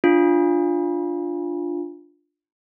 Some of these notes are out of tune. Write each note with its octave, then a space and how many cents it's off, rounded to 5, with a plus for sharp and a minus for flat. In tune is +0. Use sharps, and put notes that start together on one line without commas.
D4 +5 F4 +0